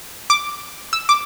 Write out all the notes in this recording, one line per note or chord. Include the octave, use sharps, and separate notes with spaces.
D6
E6
D6